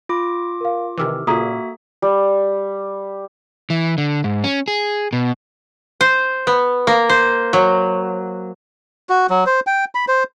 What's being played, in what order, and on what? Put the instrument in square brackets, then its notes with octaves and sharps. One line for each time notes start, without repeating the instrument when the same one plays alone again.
[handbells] F4 D6 [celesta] B5
[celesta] A#4 F5
[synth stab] C3 D#3 E3 [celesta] D6 E6 F6
[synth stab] A#2 C#3 [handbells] A#3 F#4 E5 [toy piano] A4 A#5 D#6
[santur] G3
[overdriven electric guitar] E3
D3
G#2
C#4
G#4
B2
[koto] C5
B3
A#3
C5
F#3
[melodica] F#4
F#3
C5
G5
B5
C5